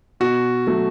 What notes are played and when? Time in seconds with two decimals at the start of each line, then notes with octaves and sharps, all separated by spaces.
0.20 B2 F#4
0.67 F#3 A3